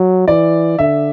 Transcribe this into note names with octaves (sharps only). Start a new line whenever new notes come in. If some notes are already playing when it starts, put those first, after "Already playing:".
Already playing: F#3
E3 D5
D3 E5